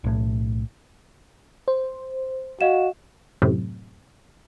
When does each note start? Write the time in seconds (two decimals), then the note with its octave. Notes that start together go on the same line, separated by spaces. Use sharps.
0.04 B1 A2
1.68 C5
2.61 F#4 D#5 F5 E7
3.42 F#2 A2 C3